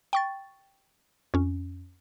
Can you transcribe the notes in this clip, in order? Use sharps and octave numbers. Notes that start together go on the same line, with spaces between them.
G5 C#6 A6
F2 C#4